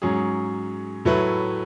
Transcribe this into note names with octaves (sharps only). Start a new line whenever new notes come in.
G#2 F#3 C#4 G#4
A2 F#3 A3 E4 B4